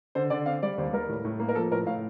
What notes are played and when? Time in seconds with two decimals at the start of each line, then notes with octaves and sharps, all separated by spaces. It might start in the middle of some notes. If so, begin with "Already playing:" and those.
0.15 D3 C5
0.30 D3 D5
0.46 C4 F5
0.63 G3 D5
0.78 D#2 C5
0.93 G3 A#4
1.09 A2
1.25 A2
1.40 A#3
1.49 A#4
1.55 F3 A4
1.72 A2 A#4
1.87 A2 F5